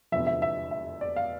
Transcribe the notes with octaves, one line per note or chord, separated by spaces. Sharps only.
F1 E2 D3 F3 E5
E5
E5
E5
D5
F5